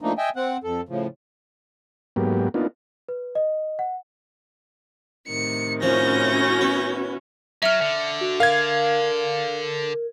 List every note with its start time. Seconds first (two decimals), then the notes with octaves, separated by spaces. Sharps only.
0.01 F3 A3 A#3 D4 D#4
0.18 D#5 E5 G5 G#5
0.36 C4 F#5
0.64 F2 A4
0.89 A2 C#3 F3
2.16 G#2 F#3 A#3 B3 G4
2.54 A#3 B3 D4 D#4 F4
3.09 B4
3.35 D#5
3.79 F#5
5.28 A2 C3 D#3 C#7
5.82 F3 C#4 E4 F#4 G6 A#6
6.61 B3
7.62 F#3 E5 F6 C#7
7.81 D3
8.21 F#4
8.40 A#4 F5 G#6